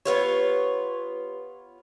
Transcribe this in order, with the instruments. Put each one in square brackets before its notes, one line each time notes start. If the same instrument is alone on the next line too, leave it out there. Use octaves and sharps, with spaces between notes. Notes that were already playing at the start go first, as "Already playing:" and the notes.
[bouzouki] B3 F4 C#5 [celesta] G4 B4